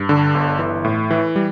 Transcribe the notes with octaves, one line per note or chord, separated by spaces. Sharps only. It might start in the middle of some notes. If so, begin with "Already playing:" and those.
Already playing: G2
D3
G1
E3
A2
E3
G3